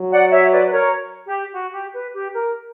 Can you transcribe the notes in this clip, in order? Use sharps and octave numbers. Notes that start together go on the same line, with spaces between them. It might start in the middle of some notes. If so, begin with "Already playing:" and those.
Already playing: F#3
D5 F#5
C#5 E5
B4 D5
B4
A#4 C#5
G4
F#4
G4
B4
G4
A#4